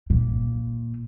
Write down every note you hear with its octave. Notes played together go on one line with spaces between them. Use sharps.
A#2